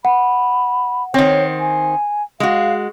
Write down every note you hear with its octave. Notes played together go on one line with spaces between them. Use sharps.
F#5 B5
D#3 C4 C#5
G#5
G#3 F#4 F5